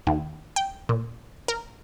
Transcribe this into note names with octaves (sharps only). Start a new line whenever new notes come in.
D#2
G5
A#2
A#4